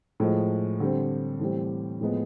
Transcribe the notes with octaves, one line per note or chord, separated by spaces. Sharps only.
A2 F3 G#3
D3 G3 C4
A2 E3 G3 C4
A2 F3 G#3 B3